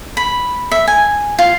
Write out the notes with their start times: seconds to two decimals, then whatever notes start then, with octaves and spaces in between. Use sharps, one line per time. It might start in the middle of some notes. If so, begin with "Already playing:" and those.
0.17 B5
0.71 E5
0.88 G#5
1.39 F4